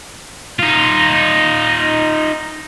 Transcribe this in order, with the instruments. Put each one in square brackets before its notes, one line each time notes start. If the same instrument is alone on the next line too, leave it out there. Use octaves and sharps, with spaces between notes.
[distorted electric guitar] D#4 F4